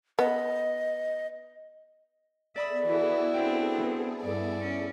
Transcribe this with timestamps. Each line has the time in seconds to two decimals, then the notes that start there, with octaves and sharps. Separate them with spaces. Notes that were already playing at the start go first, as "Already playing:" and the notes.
0.19 B3 D#5
2.56 B3 G#4 A4 D5 E5 B5 D#6
2.85 E3 E4 F#4
3.34 C4 D4 G5
3.78 E3
4.23 G2 E4 D5
4.61 C#4